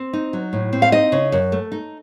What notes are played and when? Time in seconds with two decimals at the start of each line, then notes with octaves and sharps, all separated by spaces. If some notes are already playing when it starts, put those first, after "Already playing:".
Already playing: C4
0.13 D#4
0.33 F#3
0.53 A2
0.73 C4
0.82 F5
0.92 D#4 D#5
1.12 C#3
1.32 F#2
1.52 A3
1.72 D#4